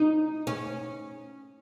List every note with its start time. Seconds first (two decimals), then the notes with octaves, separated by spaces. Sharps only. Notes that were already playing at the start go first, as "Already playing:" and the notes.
Already playing: D#4
0.47 C#4